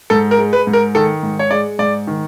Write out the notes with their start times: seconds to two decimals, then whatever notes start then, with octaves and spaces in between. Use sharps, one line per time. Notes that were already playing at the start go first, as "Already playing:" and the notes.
0.10 G#2 A4
0.31 A#4
0.39 G#3
0.53 B4
0.67 G#2
0.73 A#4
0.95 D#3 A4
1.23 G#2
1.39 C#5
1.51 G#3 D5
1.79 G#2 D5
2.07 D#3